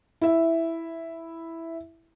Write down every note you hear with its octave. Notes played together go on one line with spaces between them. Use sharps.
E4 E5